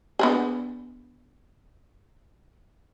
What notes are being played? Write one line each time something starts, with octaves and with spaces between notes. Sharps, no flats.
B3 D4 G#4